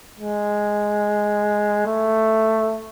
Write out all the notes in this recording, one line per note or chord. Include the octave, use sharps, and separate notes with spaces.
G#3
A3